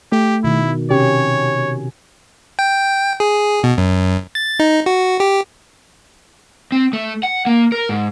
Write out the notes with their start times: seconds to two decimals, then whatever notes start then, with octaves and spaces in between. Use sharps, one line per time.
0.12 A3 G4
0.44 B2 D#3 E4
0.91 C3 C#4 G4 C#5
2.59 G5
3.20 G#4
3.64 B2
3.78 F#2
4.35 A6
4.59 D#4
4.86 F#4
5.20 G4
6.72 C4
6.93 A3
7.23 F#5
7.46 A#3
7.72 A#4
7.89 G#2